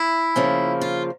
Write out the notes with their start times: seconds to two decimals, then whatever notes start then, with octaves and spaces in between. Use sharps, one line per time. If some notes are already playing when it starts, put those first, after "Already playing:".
Already playing: E4
0.36 C#3 F3 A#3
0.81 F4